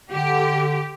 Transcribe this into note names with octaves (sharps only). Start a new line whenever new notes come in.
D3 G4